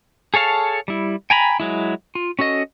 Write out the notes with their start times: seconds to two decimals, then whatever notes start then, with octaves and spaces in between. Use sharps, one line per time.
0.34 G#4 A4 C#5 F5 A5
0.88 G3 E4
1.30 G5 G#5 A#5 B5
1.60 F#3 G#3 E4
2.15 F4
2.39 C#4 F#4 A4 D#5